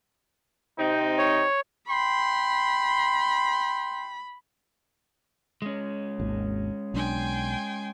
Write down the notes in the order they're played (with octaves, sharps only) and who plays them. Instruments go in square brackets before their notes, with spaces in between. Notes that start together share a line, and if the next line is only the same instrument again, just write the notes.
[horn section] C3 C4 D#4
[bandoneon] C#5
[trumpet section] G5 C6 [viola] B5
[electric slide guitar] G#3 C#4
[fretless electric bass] G#1 D#2
[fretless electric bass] B1 D4 [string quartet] G5 G#5 C6